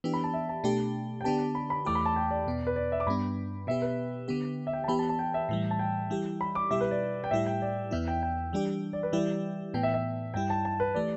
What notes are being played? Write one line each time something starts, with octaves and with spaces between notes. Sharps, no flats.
E3 B3 D4 G4
B5
A5
E5
A5
B2 A3 D4 G4
G5
D3 B3 D4 G4 A5
B5
B5
E2 E3 A3 G4 D6
B5
A5
G5
D5
E2 B2 B3
B4
D5
E5
D6
G2 G3 B3 D4 B5
B2 B3 G4 E5
B4
D3 B3 G4
E5
G5
A5
E3 B3 G4 B5
A5
A5
G5
E5
A2 E3 G3
A5
G5
E3 G3 E4 G4
B5
D6
B2 G3 E4 G4 E5
B4
D5
G5
A2 G3 E4 G4 E5
G5
D5
E2 E3 B3 E4 E5
G5
G5
E3 G3 D4 G4
D5
B4
E3 G3 E4 G4 D5
A2 E3 B3 G5
E5
E5
G2 G3 E4 G5
A5
A5
B4
E3 A3 G4 D5